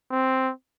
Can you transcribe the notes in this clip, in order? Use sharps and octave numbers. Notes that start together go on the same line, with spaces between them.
C4